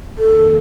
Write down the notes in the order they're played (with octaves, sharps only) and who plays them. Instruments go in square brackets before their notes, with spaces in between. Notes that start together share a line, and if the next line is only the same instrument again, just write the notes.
[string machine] F2 D#3 A#3 [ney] A4